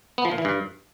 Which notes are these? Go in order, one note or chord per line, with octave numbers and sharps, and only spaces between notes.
B3
F3
A#2
E3
G2